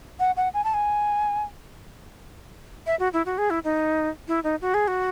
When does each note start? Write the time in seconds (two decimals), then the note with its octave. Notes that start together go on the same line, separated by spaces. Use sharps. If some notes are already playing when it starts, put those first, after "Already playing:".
0.20 F#5
0.37 F#5
0.54 G#5
0.64 A5
0.74 G#5
2.86 E5
2.99 F#4
3.13 E4
3.26 F#4
3.38 G#4
3.50 E4
3.64 D#4
4.28 E4
4.44 D#4
4.61 F#4
4.74 G#4
4.88 F#4